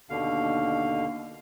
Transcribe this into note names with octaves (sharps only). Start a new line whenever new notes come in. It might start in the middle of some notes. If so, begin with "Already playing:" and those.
D#2 B2 D3 F5